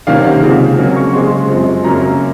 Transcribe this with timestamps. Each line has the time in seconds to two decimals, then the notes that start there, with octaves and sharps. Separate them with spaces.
0.07 C3 D#3 A#3 C#4 F5
0.24 F#5
0.42 C#3 F3 G#3 C4
0.78 C#3 F#3 A#3 C#4
0.96 C#6
1.13 C#3 G#3 C4 C6
1.48 F#2 F3 G#3 C4
1.84 F#2 C#3 F#3 A#3 C#4 A#5